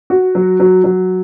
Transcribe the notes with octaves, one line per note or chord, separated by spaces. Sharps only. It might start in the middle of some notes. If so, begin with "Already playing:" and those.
F#4
F#3
F#3
F#3